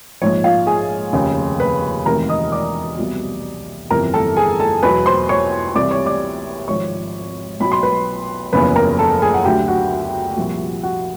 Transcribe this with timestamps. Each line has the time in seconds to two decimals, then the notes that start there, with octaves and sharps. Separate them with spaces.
0.22 A#1 G#2 F3 C#5
0.44 F4 F5
0.67 G#4 G#5
1.13 F1 D#2 C#3
1.60 B4 B5
2.06 E1 D2 C3 D#3 A#4 A#5
2.29 D#5 D#6
2.52 D5 D6
2.98 C2 B2 F#3
3.90 G1 F2 C3 E3 A#4 A#5
4.14 A4 A5
4.37 G#4 G#5
4.60 A4 A5
4.83 E2 B2 F#3 B4 B5
5.06 C5 C6
5.29 C#5 C#6
5.75 C2 C3 E3 D5 D6
5.91 C#5 C#6
6.06 D5 D6
6.68 G#1 G#2 F3 C#5 C#6
7.60 B1 B2 F#3 B5
7.72 C6
7.83 B4 B5
8.52 F#1 E2 C#3 F3 B4 B5
8.76 A#4 A#5
8.99 A4 A5
9.22 G#4 G#5
9.34 F#5
9.45 D2 D3 F#3 G4 G5
9.68 F#4 F#5
10.37 C2 A#2 F3
10.83 F#4 F#5